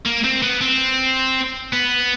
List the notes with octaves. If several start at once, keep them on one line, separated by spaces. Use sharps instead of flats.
A#3
C4
B3
C4
B3